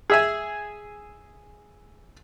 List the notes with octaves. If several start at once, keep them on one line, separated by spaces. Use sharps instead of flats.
G#4 E5 G#5